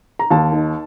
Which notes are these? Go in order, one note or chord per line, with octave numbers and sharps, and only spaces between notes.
A#5
D#2 A5
D#4